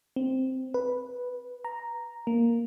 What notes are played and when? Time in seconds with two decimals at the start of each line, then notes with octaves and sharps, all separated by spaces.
0.16 C4
0.74 B4
1.65 A#5
2.27 A#3